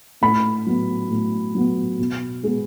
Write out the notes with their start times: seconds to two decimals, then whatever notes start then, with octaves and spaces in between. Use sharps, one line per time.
0.21 A2 B5
0.66 F#3 B3
1.10 A2
1.55 F#3 B3
1.99 B2
2.44 G#3 B3